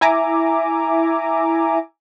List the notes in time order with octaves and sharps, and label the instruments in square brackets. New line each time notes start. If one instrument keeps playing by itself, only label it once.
[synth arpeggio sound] E4 E5 G#5 A#5 D6